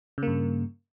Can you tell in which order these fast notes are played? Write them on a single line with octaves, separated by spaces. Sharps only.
C#3 A#3 G2